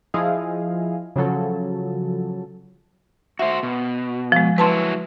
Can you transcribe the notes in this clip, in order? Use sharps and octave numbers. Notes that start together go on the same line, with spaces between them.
F3 E4 G#4 D#5 F5
C#3 F3 F#3 A4
F#4 C5 E5
B2
F3 G#3
F#3 E4 B4 A5 C6